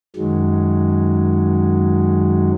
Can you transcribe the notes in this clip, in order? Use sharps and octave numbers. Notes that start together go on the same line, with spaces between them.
F#2 D#3 F#3 G#3